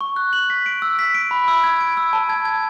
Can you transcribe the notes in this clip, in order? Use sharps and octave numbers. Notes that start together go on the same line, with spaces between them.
C#6
F#6
F#7
B6
D7
E6
B6
D7
B5
E6
G#6
D7
E6
A5
G#6
G#6